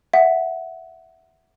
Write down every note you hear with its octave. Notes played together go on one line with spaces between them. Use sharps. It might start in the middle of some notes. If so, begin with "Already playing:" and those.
E5 F#5